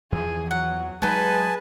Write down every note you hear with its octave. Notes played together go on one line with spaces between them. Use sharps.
E2 E3 F3 G#4
F#3 F#5
F#3 G#3 B3 D#4 G#4 B4 G#5 A5